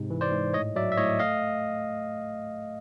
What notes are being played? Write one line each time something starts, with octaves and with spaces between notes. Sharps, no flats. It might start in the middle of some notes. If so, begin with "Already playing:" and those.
Already playing: G#2 C3
E3
C5 D5
G#2
A2 C#5 D#5
F#3 D5 E5
E5
A2 C#5 D#5
A3 D#5 F5